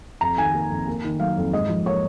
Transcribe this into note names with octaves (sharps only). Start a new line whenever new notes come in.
F2 A#5
D#3 G#5
A#3
F2
A#3
D#3
F#3 F5
F2
G#2 D#5
F3
A#3 C#5